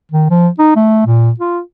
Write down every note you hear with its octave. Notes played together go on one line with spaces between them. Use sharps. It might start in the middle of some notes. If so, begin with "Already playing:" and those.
D#3
F3
D#4
A3
A#2
F4